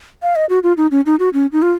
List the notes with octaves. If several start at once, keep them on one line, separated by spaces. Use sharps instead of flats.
F5
D#5
F#4
F4
D#4
C#4
D#4
F#4
C#4
D#4
F4